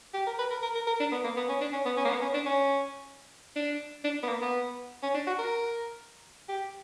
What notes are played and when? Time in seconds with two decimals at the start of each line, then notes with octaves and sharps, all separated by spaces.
0.14 G4
0.27 A#4
0.39 B4
0.51 A#4
0.63 A#4
0.75 A#4
0.87 A#4
1.00 D4
1.12 B3
1.24 A#3
1.37 B3
1.49 C#4
1.61 D4
1.73 C#4
1.86 B3
1.97 C#4
2.05 A#3
2.10 B3
2.22 C#4
2.34 D4
2.46 C#4
3.56 D4
4.04 D4
4.23 B3
4.29 A#3
4.41 B3
5.03 C#4
5.14 D4
5.27 F#4
5.39 A#4
6.49 G4